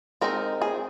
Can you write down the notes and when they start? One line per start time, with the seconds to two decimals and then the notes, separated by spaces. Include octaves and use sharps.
0.21 G#3 C4 D#4 A#4
0.62 G#4